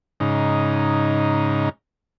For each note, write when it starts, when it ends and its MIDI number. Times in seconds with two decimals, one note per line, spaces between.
0.20 1.69 44
0.20 1.69 49
0.20 1.69 63